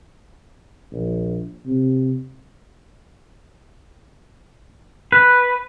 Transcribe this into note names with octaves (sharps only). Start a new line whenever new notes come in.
A#1
C3
B4